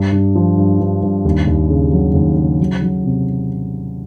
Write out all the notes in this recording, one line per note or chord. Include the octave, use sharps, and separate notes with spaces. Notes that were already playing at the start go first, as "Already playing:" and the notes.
Already playing: G2
G2
F3
G2
G2
G2
D#2
D#2
C#3
F#3
D#2
C#3
F#3
F#3
C3